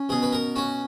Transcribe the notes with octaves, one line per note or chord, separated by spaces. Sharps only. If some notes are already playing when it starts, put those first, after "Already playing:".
Already playing: C#4
B2 G#4
B4
A#4
C#4 F#4